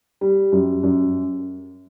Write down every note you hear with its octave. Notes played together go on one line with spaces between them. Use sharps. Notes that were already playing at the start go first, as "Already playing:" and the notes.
G3
F#2
F#2